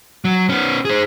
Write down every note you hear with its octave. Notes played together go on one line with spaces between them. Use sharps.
F#3
B3 C#4
G#4 C5